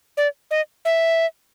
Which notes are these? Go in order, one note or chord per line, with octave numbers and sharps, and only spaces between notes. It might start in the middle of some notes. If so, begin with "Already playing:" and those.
D5
D#5
E5